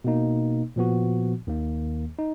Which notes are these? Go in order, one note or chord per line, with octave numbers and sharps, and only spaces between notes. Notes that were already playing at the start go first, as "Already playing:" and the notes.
B2 A#3 D#4
A#2 F3 B3 F#4
D#2 D#3 A#3
D#4